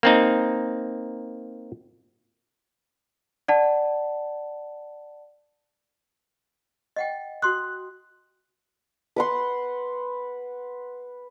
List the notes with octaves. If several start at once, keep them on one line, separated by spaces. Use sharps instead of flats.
A#3 C4 D#4
D5 F#5 A5
D#5 F#5 G5
F#4 C6 D#6 F#6
B4 F#5 C6